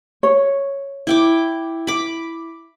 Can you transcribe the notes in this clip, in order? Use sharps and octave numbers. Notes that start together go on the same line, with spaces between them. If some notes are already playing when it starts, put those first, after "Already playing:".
C#5
E4 G5 D6
B5 D6